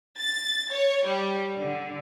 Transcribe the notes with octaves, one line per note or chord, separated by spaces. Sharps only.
A6
C#5
G3
D3